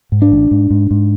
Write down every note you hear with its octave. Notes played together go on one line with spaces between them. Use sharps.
G#2
D4
A1
G#2
G#2
G#2